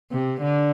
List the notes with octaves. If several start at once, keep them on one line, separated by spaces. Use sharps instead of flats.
C3
D3